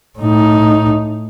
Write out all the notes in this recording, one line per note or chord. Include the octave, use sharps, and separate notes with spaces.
A2 D#4